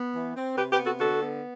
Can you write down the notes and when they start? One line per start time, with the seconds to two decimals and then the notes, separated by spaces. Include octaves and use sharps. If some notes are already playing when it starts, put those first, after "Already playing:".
Already playing: B3
0.15 E3
0.36 C4
0.57 C3 G4 B4
0.72 G4 B4
0.79 B3
0.86 F#4 A4
1.00 D3 F#4 A4
1.22 B3